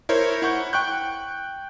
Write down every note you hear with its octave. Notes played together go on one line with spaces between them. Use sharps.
E4 A#4 C5 C#5
E4 F#5 C#6 G6
G5 C#6 F#6 G6